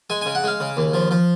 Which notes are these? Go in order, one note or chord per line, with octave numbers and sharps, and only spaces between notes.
G#3 G#5
C#3 G#5
F#5
G#3 F5
C#3
D#2
F3
F3